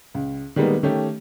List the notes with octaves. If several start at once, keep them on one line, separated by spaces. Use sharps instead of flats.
C#2
D#3 G3 G#3 A#3 B3 D#4
D#3 A3 C#4 G4